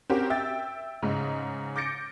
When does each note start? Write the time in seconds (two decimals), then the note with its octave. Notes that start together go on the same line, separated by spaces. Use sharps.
0.10 C4 C#4 F#4 G4 A#4
0.30 E5 G5 E6 A6
1.03 G#2 C#3 G#3
1.76 D6 G6 A6 A#6 C#7 D7